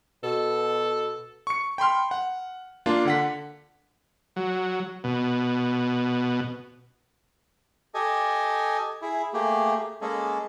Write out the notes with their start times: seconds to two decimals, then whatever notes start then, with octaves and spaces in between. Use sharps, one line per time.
0.23 B2 A4
1.47 C#6 C#7
1.78 G5 B5 C6 F6
2.11 F#5
2.86 A#3 D4 F4
3.05 D3 F#5 B6
4.36 F#3
5.04 B2
7.95 G4 A4 D#5 G#5
9.02 E4 G#4
9.33 A3 A#3 G4 G#4
10.01 G#3 A#3 C#4 G#4 A4